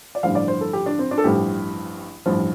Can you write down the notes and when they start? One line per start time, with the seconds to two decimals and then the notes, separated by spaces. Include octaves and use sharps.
0.15 D5
0.23 A1 G2 D3 F3 F5
0.35 D5
0.48 C5
0.61 A4
0.73 G4
0.86 D4
0.99 C4
1.11 D4
1.18 A4
1.24 A1 G2 F3 G4
2.26 A1 G2 F3